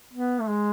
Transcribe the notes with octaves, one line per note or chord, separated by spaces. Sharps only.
B3
A3
G#3